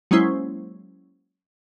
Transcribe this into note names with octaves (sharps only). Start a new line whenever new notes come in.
F#3 G#3 A#3 C#4 E4 C5